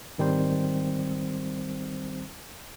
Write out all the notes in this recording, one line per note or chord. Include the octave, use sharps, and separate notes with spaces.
G#1 D#3 G3 C4 C5